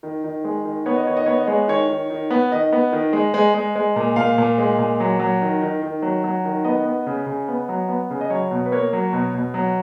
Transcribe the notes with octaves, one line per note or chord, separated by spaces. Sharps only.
D#3
D#3
G#3
D#3
B3 C#5
D#5
D#3 C#5
D#5
B3 C#5
D#5
G#3 C#5
D#3 C#5
D#3
D#3
B3
D#3 D#5
B3
D#3
G#3
G#3
G#3
G#3
A#2
A#2 F5
A#2
G#3
A#2
F#3
F#3
D#3
D#3
D#3
F#3
F#3
D#3
B3 D#5
B3
C#3
C#3
B3
F#3
B3
C#3
D#5
F#3 C#5
B2
B4
A#3 C#5
F#3
B2
B2
F#3